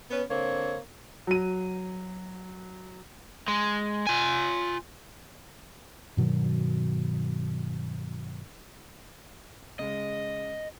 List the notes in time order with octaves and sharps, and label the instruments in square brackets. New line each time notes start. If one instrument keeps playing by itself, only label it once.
[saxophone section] B3 C#4 B4
D3 A#3 C4 C#5
[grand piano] F#3 D#7
[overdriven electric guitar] G#3
F4 G#5
[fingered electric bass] G2 B2 D#3 F#3
[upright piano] C#3 G#3 [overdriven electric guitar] D#5